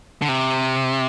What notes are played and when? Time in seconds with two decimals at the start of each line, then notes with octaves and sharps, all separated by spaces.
0.22 D3
0.29 C3